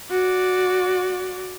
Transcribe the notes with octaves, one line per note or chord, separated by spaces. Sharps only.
F#4 D5